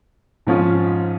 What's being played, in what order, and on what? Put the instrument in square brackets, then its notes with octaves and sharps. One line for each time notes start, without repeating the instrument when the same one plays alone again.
[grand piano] G#2 F3 C#4 F4